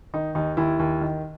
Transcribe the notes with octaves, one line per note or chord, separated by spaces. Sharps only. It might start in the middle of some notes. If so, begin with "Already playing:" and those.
D#3 D#4
D#2 D#4
D#2 E4
D#2
D#3